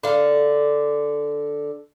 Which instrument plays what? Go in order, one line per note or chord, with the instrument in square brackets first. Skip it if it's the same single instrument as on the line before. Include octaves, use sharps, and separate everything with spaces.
[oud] D3 F5